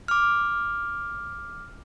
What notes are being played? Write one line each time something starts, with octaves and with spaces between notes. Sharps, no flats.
D6 F6